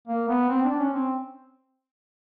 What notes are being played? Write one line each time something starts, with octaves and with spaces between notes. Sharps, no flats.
A#3
B3
C4
D4
C#4
C4